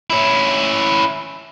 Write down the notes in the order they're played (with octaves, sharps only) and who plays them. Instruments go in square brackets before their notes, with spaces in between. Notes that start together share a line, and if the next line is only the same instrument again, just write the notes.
[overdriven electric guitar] C#4 E4